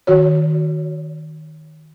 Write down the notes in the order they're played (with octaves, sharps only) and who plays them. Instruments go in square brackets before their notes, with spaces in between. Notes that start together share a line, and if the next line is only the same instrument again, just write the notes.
[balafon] D#3 F#4 C#5